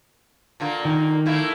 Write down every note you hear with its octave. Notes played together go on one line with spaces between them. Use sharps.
A#2 D3 A#3
D#3
A3 A#3 E4